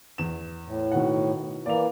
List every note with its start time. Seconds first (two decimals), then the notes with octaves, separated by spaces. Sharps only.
0.18 E2 E7
0.66 A2
0.92 B2 D#3 F#5
1.66 E3 A#3 D5 F7